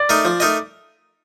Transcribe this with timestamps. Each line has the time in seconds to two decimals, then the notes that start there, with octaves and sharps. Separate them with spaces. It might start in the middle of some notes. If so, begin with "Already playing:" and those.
Already playing: D5
0.09 A3 D#4 A#4 D#5
0.25 F3
0.40 A3 D#4 A#4 D#5